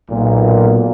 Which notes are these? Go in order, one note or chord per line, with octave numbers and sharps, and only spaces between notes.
B1 A#2